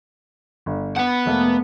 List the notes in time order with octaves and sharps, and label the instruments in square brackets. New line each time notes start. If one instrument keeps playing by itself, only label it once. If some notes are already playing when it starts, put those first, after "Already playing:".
[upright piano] G1
[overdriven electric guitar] B3 F#5 [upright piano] C#7
[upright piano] F1 A3 A#3